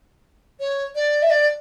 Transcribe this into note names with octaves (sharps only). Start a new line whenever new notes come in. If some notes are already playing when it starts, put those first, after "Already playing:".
C#5
D5
E5
D5